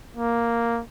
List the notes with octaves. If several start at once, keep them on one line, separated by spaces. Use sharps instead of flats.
A#3